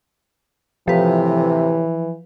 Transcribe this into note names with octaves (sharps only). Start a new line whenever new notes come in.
A2 C3 E3 F3 B4